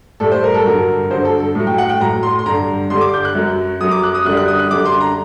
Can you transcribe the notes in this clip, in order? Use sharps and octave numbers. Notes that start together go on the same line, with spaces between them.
A2 G3 A4
C5
A#4
A4
G2 D3 F#3 A#4
G2 D3 F#3 C5
A4
A4
A2 F#3
G5
F#5
G5
A2 F#3 A#5
C6
C6
G2 D3 G3 A#5
G2 D3 G3 C6
D6
G6
F#6
F#2 F#3
F#2 F#3 D#6
D6
F#6
D#6
F#2 D3 G3 F#6
F#6
D#6
F#6
F#2 D3 G3 D6
C6
A#5